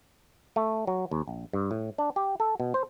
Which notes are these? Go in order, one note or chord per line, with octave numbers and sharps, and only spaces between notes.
A3
F#3
D#2
A#1
G2
A2
D4
G4
A4
B2
C5